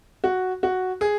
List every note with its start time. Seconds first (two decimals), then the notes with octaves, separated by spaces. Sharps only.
0.24 F#4
0.63 F#4
1.01 G#4